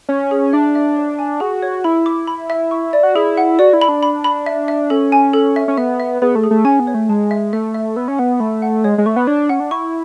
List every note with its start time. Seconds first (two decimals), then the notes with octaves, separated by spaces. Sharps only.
0.09 C#4 C#5
0.31 G#4
0.53 D4 E5
0.75 E5
0.96 C#5
1.19 G#5
1.40 F#4 G#4
1.62 C#5
1.84 E4 B5
2.06 D6
2.27 B5
2.50 E5
2.71 C#6
2.93 D5
3.03 F#4
3.15 E4 G#4
3.37 F#5
3.59 F#4 D5
3.73 E4
3.81 B5
3.89 D4
4.03 B5
4.24 B5
4.46 E5
4.68 E5
4.90 C#4 A4
5.12 G#5
5.33 A4
5.56 E5
5.68 C#4
5.78 B3 E5
6.00 E5
6.22 B3 G#4
6.35 A3
6.44 G#4
6.51 A3
6.65 C#4 G#5
6.80 B3
6.87 C#5
6.94 A3
7.09 G#3 A5
7.31 E5
7.53 A3 E5
7.74 E5
7.96 B3 E6
8.08 C#4
8.18 B3 F#5
8.40 A3 B5
8.62 F#5
8.84 G#3 C#5
8.98 G#3
9.06 A3 C#6
9.16 B3
9.27 D4 C#5
9.49 C#4 F#5
9.60 D4
9.71 E4 C#6